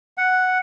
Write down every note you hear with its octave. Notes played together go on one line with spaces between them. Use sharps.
F#5